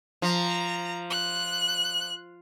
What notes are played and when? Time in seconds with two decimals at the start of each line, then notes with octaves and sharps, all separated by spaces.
0.22 F3 A#5
1.10 F#6